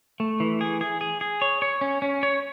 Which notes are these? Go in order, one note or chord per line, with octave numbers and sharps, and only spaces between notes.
A3
E3
G#4
G#4
G#4
G#4
C#5
C#5
C#4
C#4
C#5